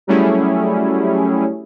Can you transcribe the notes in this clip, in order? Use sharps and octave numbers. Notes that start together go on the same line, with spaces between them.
F#3 G3 A3 C#4 E4 G#4